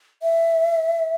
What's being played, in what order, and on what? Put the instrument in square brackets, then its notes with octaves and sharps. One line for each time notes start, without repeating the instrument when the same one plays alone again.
[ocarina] E5